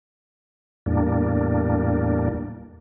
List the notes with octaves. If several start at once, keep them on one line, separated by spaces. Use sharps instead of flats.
E2 A2 G3 A#3 D4